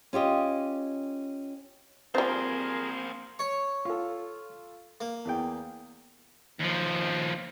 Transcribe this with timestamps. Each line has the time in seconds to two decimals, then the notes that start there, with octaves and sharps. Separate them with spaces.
0.13 C#4 F4 G4 D#5
2.15 F3 G3 A#3 C4 G#4 A#4 C5
3.39 C#5 C#6
3.85 F4 A4
5.01 A#3
5.25 E2 G#4 G5
6.59 D#2 F3